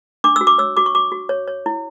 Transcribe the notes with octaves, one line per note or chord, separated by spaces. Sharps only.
D4 D6
E6
F#4
D6
C#5 E6
F#4 D6
C#6
F#4 D6
F#4
C#5
C#5
E4